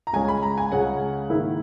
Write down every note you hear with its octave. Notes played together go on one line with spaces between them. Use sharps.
A#5
C#2 C#3 G#3 C#4 G#5
B5
A#5
G#5
C#2 C#3 G#3 C#4 F#5
G#2 D#3 A#3 E4